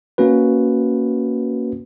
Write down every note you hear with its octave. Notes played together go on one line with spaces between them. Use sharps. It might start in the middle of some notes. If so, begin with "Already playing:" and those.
A#3 C#4 F#4 B4